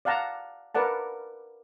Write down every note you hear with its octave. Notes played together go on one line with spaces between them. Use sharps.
D5 F5 F#5 A5 A#5
A#4 B4 D5 F#5 A5